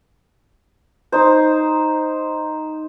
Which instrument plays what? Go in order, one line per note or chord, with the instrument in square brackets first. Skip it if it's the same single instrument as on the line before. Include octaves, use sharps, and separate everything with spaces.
[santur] D#4 C5